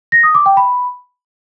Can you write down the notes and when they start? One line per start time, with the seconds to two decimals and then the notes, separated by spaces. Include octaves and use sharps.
0.12 A#6
0.23 D#6
0.35 D6
0.46 G5
0.57 B5